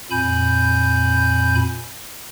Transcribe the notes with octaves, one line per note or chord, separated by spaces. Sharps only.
F2 A#2 G#5 B5 G6